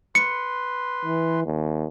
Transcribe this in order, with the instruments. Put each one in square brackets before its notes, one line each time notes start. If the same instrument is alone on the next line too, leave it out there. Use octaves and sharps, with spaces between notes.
[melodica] B4 C6 [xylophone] C#7
[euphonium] E3
D#2